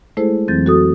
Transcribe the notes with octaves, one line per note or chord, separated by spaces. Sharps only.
G#3 A3 E4 G#4 A4 C5
F2 E3 F#3 C4 G6 A6
F#4 A4 D#6